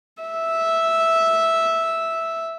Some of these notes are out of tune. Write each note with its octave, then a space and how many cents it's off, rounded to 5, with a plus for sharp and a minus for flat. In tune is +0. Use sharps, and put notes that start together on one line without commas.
E5 -5